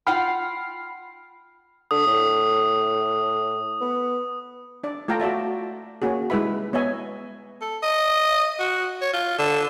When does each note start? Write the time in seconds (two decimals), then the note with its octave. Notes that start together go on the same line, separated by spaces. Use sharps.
0.07 F4 F#5 G5 B5 F6 C7
1.91 D3 D#6
2.07 A2
3.81 B3
4.83 D4 D5
5.08 A3 F4 A4 F5 G5 A#5
5.20 F#4 D5 E5 A5
6.02 A#3 C#4 F#4 G#4
6.30 G3 G#3 E4 B4 E5 B5
6.73 B3 C#5 D#5 E5 G#5
7.61 A4
7.83 D#5
8.59 F#4
9.02 C#5
9.13 F4
9.38 D3